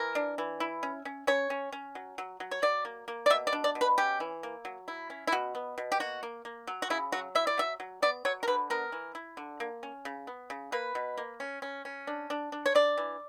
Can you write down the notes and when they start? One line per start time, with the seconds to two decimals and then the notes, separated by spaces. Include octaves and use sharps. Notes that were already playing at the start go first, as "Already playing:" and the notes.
Already playing: E3 A#4
0.15 D4
0.38 E3
0.60 E4
0.83 C#4
1.05 C#4
1.27 C#4 C#5
1.50 C#4
1.72 C#4
1.95 F#3
2.18 F#3
2.40 F#3
2.51 C#5
2.62 F#3 D5
2.85 A#3
3.08 A#3
3.26 D5
3.30 B2 E5
3.47 D5
3.53 D4
3.64 D5
3.75 B2
3.81 B4
3.98 C#4 G4
4.20 E3
4.43 A#3
4.65 F#3
4.88 E4
5.10 C#4
5.27 E4
5.32 B2 F#4
5.55 B3
5.78 B2
5.92 G4
6.00 A#3 F#4
6.23 A#3
6.45 A#3
6.67 F#3
6.82 F#4
6.90 C#3 E4
7.12 F#3 F#4
7.35 E4 E5
7.47 D5
7.58 F#3 E5
7.80 F#3
8.02 B3 D5
8.25 F#3 C#5
8.43 A#4
8.47 D3 B4
8.70 B3 A#4
8.92 E3
9.15 E4
9.37 D3
9.60 A#3
9.83 C#4
10.05 C#3
10.27 B3
10.50 C#3
10.72 A#3 B4
10.95 B2
11.17 A#3
11.40 C#4
11.62 C#4
11.85 C#4
12.07 D4
12.30 D4
12.52 D4
12.66 C#5
12.75 D4 D5
12.97 E3